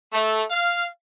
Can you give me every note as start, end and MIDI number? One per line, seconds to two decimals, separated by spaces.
0.13 0.43 57
0.51 0.85 77